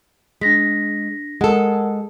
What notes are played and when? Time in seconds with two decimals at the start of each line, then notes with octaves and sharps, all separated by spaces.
0.41 G#3 D4 A#6 B6
1.41 G#3 A4 A#4 F#5